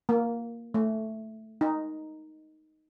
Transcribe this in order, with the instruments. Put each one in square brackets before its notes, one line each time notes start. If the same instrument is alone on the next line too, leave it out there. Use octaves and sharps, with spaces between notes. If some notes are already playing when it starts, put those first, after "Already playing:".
[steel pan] A#3
A3
D#4